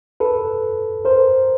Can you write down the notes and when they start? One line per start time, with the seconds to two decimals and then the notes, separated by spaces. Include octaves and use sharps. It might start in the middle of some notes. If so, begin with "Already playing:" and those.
0.20 A4 B4
1.05 A#4 C5